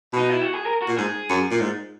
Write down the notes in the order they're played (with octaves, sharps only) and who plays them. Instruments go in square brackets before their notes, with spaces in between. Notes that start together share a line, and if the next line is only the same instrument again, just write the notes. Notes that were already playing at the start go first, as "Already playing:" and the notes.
[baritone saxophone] B2 [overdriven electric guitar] D#4
[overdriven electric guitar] E4
F#4
G#4
A#4
F#4
[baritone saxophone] A#2
[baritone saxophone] G#2 [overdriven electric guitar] G#4
[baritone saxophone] F#2
A#2
G#2